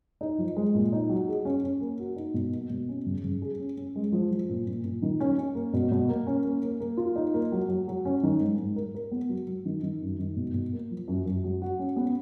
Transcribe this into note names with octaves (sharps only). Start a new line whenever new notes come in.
D#4
F3
G#3
A#2
D#4
F#3
G#4
C#4
C#4
A#3
F#4
D#4
B2
A#3
B2
C#4
C#3
C#3
G#4
C#4
C#4
G#3
F3
F3
A#2
A#2
A#2
D#3
C#4
C#4
A#3
B2
B2
A#3
C#4
A#3
A#3
A#3
F4
D#4
A#3
F#3
F#3
F#3
C#4
D#3
G#2
G#2
A#4
A#4
B3
F#3
F#3
D#3
D#3
F#2
D#3
B2
B2
A#3
F3
F#2
F#2
F#3
F#4
C#4
B3